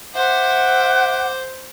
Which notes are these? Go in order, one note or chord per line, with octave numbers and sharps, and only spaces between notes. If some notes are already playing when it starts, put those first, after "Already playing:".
C5 E5 F#5 D6